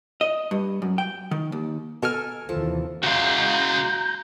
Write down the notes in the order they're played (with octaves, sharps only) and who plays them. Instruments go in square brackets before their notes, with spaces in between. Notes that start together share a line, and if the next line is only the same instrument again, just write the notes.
[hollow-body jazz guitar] D#5
G2
F#2
G5
D#3
D#2
[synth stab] B2 F6 [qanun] A4 A#4 G#5
[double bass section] D#2 C3 E3 [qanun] F3 A4
[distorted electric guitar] C#3 G#3 [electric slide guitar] F#4 F5 [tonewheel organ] A#5 G6